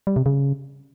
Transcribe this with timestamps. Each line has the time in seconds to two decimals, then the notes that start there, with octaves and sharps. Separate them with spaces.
0.07 G3
0.16 C3
0.26 C#3